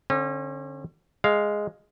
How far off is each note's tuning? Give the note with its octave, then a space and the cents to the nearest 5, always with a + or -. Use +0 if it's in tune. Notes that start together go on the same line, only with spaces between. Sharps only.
D3 +0 C#4 -40
G#3 +0 F5 +0